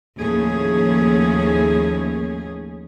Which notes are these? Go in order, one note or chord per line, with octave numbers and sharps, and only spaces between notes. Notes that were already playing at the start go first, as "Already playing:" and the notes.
D#2 A2 F3 A3 C#4 G#4